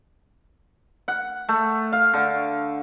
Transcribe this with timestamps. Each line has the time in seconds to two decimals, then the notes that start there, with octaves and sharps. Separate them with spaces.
1.08 F#5
1.49 A3
1.92 F5
2.14 D3